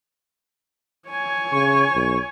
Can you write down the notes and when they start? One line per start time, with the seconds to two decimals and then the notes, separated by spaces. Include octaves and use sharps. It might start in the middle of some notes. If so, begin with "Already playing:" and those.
1.09 C#5 G#5
1.52 C#3 C#6
1.95 B1